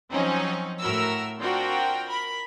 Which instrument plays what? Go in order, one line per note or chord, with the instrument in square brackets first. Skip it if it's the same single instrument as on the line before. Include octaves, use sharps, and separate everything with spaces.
[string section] F3 F#3 C4 C#4 D#4
A2 F#4 A#4 E6
C4 D4 F4 F#4 A#4 G5
A#4 B5